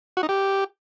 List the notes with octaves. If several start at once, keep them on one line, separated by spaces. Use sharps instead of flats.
F#4
D#4
G4